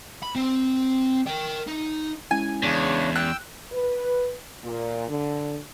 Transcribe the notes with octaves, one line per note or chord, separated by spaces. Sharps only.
B5
C4
A#4 G5
D#4
G#3 C#4 E4 G#5
E2 C#3 D4 C#5
G5 E6 F#6
B4
A#2
D3